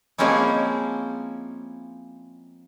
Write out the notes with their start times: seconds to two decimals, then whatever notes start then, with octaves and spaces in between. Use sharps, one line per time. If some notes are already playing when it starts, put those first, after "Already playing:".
0.18 F3 G#3 A#3 C4 C#4 E4